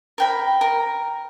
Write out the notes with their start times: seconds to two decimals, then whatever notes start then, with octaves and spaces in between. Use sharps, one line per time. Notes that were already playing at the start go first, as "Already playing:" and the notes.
0.18 A#4 G5 B5
0.61 A#4